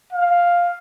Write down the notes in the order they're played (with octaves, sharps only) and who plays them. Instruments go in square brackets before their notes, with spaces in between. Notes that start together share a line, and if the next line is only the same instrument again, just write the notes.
[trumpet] F5